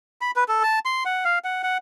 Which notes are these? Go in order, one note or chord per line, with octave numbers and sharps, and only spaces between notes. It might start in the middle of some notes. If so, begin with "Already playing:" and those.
B5
B4
A4
A5
C6
F#5
F5
F#5
F#5